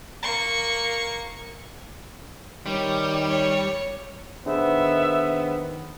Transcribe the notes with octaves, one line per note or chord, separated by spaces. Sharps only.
A#3 C#6
D#3 G3 C#5
C#5
D#3 B3 D4 G#4 C5 E5